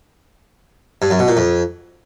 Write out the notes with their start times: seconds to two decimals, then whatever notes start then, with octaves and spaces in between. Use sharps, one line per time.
1.02 G2
1.11 F#2
1.19 B2
1.28 A#2
1.37 F2